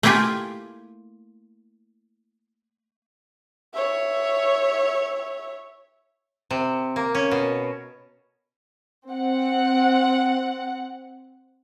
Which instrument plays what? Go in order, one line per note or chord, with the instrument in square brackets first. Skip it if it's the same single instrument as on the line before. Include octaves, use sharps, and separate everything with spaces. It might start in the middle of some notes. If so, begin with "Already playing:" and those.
[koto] A3 A#3 E4 F4 G4 G#5
[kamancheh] C#5 E5
[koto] C3
A#3
C#4
B2
[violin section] C4 F#5